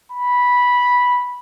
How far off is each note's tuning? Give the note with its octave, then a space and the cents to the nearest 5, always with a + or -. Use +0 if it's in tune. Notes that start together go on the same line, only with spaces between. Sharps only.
B5 -10